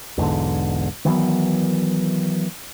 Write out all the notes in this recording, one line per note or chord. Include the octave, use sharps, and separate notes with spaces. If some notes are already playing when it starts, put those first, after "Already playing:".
B1 E2 G#2 D3
D#3 E3 F#3 B3